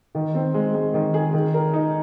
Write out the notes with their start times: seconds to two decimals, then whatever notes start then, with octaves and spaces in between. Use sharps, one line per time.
0.15 D#3
0.35 C4
0.54 G#3
0.74 G#3
0.94 D#3
1.14 G#4
1.34 D#3
1.54 A#4
1.73 D#4